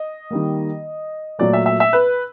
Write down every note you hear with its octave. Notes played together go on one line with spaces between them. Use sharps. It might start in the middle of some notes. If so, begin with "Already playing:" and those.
Already playing: D#5
D#3 G3 A#3
A#2 F#3 A3 D5
E5
E5
E5
B4